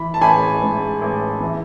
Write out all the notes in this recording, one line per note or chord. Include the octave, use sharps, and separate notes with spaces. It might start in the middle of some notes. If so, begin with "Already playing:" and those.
Already playing: E3 B5
A5
A1 G#5 B5
G#2
A1
E3